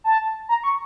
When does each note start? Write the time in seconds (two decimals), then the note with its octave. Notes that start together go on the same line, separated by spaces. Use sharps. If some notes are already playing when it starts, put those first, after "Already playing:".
0.04 A5
0.49 A#5
0.64 C#6